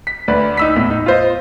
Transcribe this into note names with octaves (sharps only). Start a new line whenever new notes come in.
B6
D2 B4 D5
D#4 E6 B6
E2 A2
D#4
F4 C5 D#5